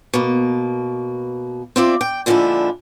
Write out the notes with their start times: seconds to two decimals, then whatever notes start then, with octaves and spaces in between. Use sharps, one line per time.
0.14 B2 A#3
1.76 C4 F4 D5 E5
2.01 G5
2.26 A#2 D3 F3 G#3 D4 E4